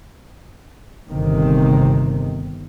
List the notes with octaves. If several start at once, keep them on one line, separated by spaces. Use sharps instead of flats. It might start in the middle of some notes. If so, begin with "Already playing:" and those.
G1 C3 D#3